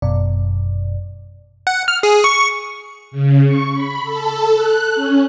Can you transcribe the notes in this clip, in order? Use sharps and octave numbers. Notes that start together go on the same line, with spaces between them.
G1 F#2 B2 D5
F#5
F6
G#4
C#6
C#3
C#6
B5
A4
F#6
C#4